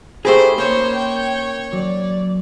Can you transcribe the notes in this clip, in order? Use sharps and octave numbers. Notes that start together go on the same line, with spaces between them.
A3 G4 G#4 A#4 C5 B5 D#6
A#3 C#4 C5 C#5
G5
F#3 D5